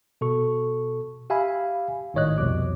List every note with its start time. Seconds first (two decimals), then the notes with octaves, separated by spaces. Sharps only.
0.21 B2 A4 C#6
1.30 G4 E5 F5 G#5 B5
2.14 G#1 A2 D#3 C#5 D#5 F#6
2.38 C2 F2 B2 D6